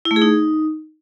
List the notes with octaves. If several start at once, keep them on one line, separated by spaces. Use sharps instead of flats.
E4
A3
G#4
D#4